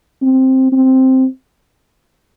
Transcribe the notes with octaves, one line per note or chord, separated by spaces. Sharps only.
C4
C4